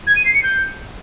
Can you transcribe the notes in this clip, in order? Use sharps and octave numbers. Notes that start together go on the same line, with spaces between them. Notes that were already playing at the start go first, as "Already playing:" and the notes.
G#6
D#7
C7
C#7
G6